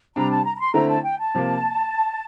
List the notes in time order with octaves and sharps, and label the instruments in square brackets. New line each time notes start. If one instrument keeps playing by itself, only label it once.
[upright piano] C3 G3 D4 [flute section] A#5
[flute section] A5
A#5
A#5
C6
[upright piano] D3 A3 C4 E4 [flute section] A#5
[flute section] A5
G5
A5
[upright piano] C3 F3 A#3